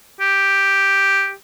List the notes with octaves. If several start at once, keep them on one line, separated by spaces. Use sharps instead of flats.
G4